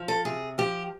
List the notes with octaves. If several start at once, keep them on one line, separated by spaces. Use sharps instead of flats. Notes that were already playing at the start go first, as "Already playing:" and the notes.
Already playing: F3
A4
C3 G#4
F3 G4